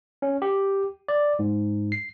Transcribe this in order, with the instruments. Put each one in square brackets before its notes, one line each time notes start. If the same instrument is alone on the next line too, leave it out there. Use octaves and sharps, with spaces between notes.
[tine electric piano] C#4
G4
D5
G#2
C7